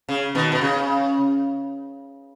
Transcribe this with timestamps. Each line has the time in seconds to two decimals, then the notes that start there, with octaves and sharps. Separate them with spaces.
0.09 C#3
0.35 B2 D#3
0.52 B2
0.61 C#3